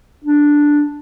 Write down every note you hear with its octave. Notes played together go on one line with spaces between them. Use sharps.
D4